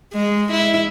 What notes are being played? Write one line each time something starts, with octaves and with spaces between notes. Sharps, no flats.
G#3
E4